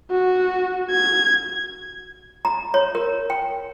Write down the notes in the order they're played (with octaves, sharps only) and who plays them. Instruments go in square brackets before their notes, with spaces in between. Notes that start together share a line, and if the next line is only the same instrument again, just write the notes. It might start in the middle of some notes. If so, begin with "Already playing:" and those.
[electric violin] F#4
G#6
[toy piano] A#5
C#5
A#4
G5